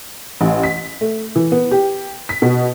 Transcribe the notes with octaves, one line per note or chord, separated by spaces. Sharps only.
A1
B6
A3
E3
B3
G4
B6
B2